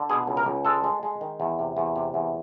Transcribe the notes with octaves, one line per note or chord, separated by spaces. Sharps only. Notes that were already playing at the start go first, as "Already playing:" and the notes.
Already playing: D3
B2 G#4
C#2
A#4
C#2
G#3 A4
G#3
G#3
D#3
E2
C3
E2
C3
E2